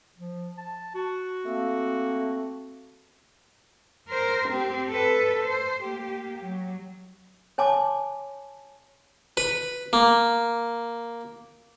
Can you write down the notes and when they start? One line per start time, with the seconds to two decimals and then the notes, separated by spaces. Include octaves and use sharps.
0.18 F3
0.58 A5
0.95 F#4
1.45 A3 A#3 C4
4.09 A#4 C5
4.49 C4 G4
4.89 A4 B4
5.44 C5
5.83 A#3 G4
6.42 F#3
7.58 C#5 G#5 A5 C6 D6
9.37 B4
9.93 A#3